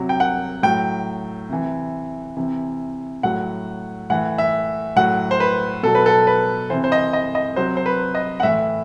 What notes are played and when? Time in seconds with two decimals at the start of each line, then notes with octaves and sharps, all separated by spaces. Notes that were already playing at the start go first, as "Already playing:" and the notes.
Already playing: C3 F#3
0.09 G5
0.20 F#5
0.63 A2 F#3 G5
1.49 C3 E3
2.37 C3 E3
3.23 A2 F#3 F#5
4.10 A2 E3 F#5
4.38 E5
4.96 A2 F#3 F#5
5.31 C5
5.40 B4
5.83 B2 F#3 A4
5.95 B4
6.06 A4
6.27 B4
6.70 C3 E3 C5
6.84 C5
6.92 D#5
7.13 D#5
7.35 D#5
7.56 C3 F#3 C5
7.77 C5
7.86 B4
8.15 D#5
8.40 F#5
8.43 A2 E3 E5